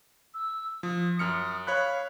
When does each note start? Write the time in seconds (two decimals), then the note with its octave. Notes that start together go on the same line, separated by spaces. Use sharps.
0.34 E6
0.83 F3 D#6
1.19 F#2 F6 C#7
1.67 C#5 F5 B5 F#6